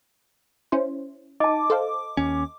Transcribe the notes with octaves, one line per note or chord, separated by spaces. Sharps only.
C#4 E4 C5
D#4 D#5 A5 D6
A4 C5 F5
D#2 C#4